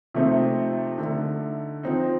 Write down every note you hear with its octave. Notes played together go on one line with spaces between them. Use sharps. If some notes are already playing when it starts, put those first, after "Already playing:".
C3 F3 A3 C4 D#4
D3 A3 D#4
F3 C4 D#4